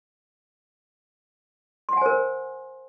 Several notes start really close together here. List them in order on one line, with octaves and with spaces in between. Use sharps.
C6 F#5 G#5 C5 A#4